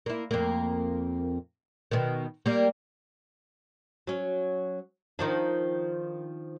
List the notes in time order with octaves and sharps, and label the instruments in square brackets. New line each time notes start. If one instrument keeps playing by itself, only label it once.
[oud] A#3 E4
F2 A#3
B2 D#3
G3 A#3
F#3 C#4
D#3 F3 D4